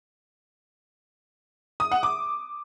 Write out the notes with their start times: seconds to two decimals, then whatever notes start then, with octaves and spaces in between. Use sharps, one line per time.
1.80 D#6
1.92 F#5
2.03 D6